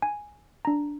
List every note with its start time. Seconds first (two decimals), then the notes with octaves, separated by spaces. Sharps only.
0.02 G#5
0.65 D4 A#5